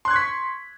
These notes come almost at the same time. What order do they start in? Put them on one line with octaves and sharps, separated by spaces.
C6 F#6 G#6 C#6 B6